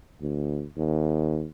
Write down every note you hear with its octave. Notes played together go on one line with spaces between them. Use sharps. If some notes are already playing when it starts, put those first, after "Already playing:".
D2
D#2